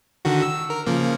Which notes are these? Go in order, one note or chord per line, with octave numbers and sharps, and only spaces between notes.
D3 D#3 F#4
E6
A#4
C#3 F3 A#3